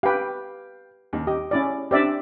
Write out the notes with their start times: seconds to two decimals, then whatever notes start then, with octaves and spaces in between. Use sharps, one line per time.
0.03 G4 B4 F5 G5
1.13 D#2
1.27 G4 D#5
1.51 C#4 E4 D5
1.91 C4 D4 G4 D5 E5